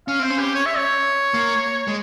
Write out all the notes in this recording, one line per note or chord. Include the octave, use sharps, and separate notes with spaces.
C#4 F5
C4 C5
C#4
G4
C#5
E5
C#5
A#3
G#3